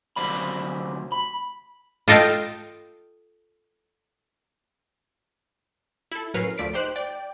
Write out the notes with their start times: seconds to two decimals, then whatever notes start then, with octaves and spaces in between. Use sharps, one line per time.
0.16 D2 C3 F#3 C5 D5 B5
1.12 B5
2.08 F4 A4 D#5 F5 G5
6.12 E4 A4
6.34 A2 F#3 C#4 A#4 B4 C7
6.58 D2 F3 A3 D5 B6 D7
6.74 D#4 G4 C5 F#6
6.96 D5 G5